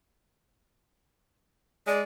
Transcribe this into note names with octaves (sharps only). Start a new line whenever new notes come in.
G#3 D5